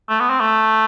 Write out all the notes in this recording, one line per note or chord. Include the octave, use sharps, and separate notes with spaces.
A3
B3
C4
A3